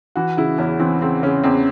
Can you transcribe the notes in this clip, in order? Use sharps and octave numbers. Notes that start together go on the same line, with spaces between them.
E3 F#4
C#3 E4
E2 C#4
E3 C4
C#3 C4
C#3 C#4
E2 C4